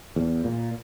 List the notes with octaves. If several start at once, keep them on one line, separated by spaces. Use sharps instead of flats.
E2
A#2